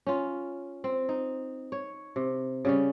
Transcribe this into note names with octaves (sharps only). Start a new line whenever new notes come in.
C#4 F4
C4
D#4
C#5
C3
C#3 G3 C#4